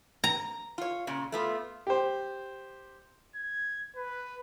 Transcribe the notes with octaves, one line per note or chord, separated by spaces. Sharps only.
A#5
F4 C#5
A#2 C#3
A3 B3 F4
G4 C5
G#6
B4